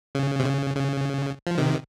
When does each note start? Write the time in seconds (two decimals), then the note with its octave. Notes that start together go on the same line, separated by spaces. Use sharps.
0.15 C#3
0.39 C3
0.46 C#3
0.76 C#3
1.47 F3
1.58 C3 D#3